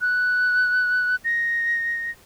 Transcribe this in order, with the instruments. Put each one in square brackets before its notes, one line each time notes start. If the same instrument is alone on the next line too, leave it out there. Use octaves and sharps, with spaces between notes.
[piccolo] F#6
A#6